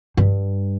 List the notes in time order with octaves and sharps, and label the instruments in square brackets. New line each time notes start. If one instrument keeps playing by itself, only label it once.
[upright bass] G2